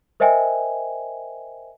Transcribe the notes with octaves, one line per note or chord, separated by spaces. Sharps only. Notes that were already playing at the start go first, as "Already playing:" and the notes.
A#4 C5 D#5 E5 G5 G#5